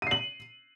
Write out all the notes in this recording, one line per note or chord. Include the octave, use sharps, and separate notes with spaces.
C7 D#7 F#7